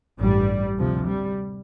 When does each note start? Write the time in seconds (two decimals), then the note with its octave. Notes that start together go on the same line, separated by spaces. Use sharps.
0.19 A1 G2 G3
0.78 D2 C3 F3
1.07 G3